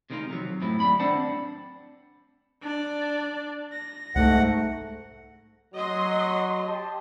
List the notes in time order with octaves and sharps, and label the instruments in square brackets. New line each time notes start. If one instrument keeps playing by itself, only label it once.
[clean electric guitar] C3 D#3 G#3 B3 D#4 F4
C3 F3 F#3
F#2 A2 C4 E4
D#2 A2 G3 B5
C4 D4 C5 D5 F#5 A5
[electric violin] D4 D5
A#6
[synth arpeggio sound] C2 [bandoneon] G#2 F#5 [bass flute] A3
[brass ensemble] F#3 [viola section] D#5 C6
[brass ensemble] G4 A5